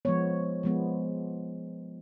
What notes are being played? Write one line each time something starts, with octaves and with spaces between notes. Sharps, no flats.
F3 G#3 B3 C#5
F3 G#3 B3